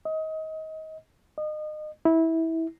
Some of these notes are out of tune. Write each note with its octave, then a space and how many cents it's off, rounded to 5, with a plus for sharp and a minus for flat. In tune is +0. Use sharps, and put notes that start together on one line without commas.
D#5 +25
D#5 -30
E4 -20